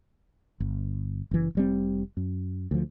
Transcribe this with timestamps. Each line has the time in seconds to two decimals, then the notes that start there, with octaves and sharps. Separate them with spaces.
0.60 G1
1.31 F#1 E3
1.55 F1 G3 C4
2.17 F#2
2.71 D2 F3